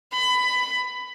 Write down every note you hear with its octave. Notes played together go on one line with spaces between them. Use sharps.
B5